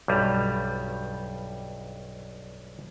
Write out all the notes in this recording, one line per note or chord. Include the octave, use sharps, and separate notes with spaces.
B1 G2 G3